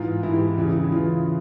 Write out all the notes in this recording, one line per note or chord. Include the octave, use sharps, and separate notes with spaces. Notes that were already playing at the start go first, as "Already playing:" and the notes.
Already playing: G#2 E3 F4
G#2 E3 E4
G4
E2 C#3 E3
E4
E2 C#3 E3 F4